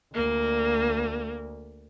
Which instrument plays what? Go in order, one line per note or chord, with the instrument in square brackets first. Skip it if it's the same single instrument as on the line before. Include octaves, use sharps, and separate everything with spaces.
[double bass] D2 [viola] A#3